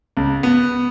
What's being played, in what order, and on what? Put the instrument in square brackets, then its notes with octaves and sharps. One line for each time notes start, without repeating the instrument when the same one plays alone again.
[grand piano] C#2
B3